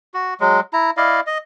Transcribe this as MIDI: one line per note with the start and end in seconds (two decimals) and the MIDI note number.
0.14 0.34 66
0.40 0.60 54
0.40 0.60 56
0.73 0.91 64
0.73 0.91 82
0.97 1.20 64
0.97 1.20 74
0.97 1.20 75
0.97 1.20 77
1.27 1.38 75